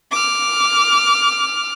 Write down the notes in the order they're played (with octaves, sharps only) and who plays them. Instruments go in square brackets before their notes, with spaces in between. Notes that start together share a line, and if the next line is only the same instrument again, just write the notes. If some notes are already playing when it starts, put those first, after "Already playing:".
[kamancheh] D6 F6